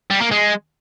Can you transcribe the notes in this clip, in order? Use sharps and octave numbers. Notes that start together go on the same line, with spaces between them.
G3
A#3
G#3